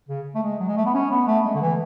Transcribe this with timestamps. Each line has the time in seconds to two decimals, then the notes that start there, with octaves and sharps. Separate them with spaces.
0.09 C#3
0.35 A3
0.43 G#3
0.59 F#3
0.68 G#3
0.77 A3
0.86 B3
0.94 C#4
1.11 B3
1.28 A3
1.45 G#3
1.55 D3
1.62 E3